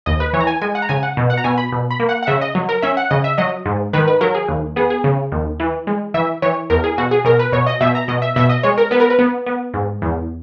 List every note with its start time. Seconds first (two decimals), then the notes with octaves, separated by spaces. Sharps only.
0.06 D#2 D#5
0.20 B4
0.33 E3 C#5
0.41 A#5
0.47 G#5
0.62 G#3 G#5
0.75 F#5
0.82 A#5
0.89 C#3 G#5
1.03 F#5
1.17 B2
1.30 F#5
1.37 A#5
1.44 B2 G#5
1.58 B5
1.72 B2
1.91 B5
2.00 A#3
2.09 F#5
2.23 F#5
2.27 C#3 E5
2.41 D#5
2.55 F#3
2.69 A#4
2.82 C#4 E5
2.97 F#5
3.11 C#3 D#5
3.24 E5
3.38 F#3 D#5
3.66 G#2
3.93 D#3 B4
4.08 B4
4.21 F#3 A#4
4.35 G#4
4.48 D#2
4.76 B3 G#4
4.90 G#4
5.04 C#3
5.32 D#2
5.60 E3
5.87 G#3
6.14 E3 E5
6.42 E3 C#5
6.70 E2 A#4
6.84 G#4
6.98 B2 F#4
7.11 G#4
7.25 B2 A#4
7.39 B4
7.52 B2 C#5
7.66 D#5
7.81 B2 E5
7.95 A#5
8.08 B2 D#5
8.22 E5
8.36 B2 E5
8.49 D#5
8.63 G#3 C#5
8.78 A#4
8.91 B3 B4
9.00 A#4
9.10 B4
9.19 B3
9.47 B3
9.74 G#2
10.02 E2